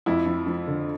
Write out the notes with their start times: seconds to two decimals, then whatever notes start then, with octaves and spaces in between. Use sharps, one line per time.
0.06 F2 E4
0.26 F3
0.47 F3
0.67 D3